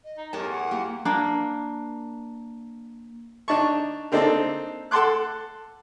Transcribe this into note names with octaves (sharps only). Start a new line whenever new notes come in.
D#5
D#4
E2 A2 G4 A#4 C#5 G5 A5
F#5
A#3 G4
A#3 D4
D4 D#4 A5 C#6
A#3 C4 D4 D#4 A4
A4 F#5 A5 C6 D6 F#6